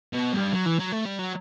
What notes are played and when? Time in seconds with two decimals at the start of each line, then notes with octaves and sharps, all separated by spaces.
0.13 B2
0.33 G2
0.53 F#3
0.66 E3
0.79 F#3
0.92 A3
1.05 G3
1.19 F#3